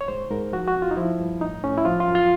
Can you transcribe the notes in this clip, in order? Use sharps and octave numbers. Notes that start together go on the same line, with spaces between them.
C#5
G#2 C5
G#2 A#4
F3 F#4
F#4
F2
F4
D#4
F3 E4
G2
A2 D#4
A2 C#4
E4
F3 F4
F4
F#2
F4